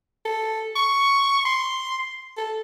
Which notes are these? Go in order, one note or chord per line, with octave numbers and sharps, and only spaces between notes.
A4
C#6
C6
A4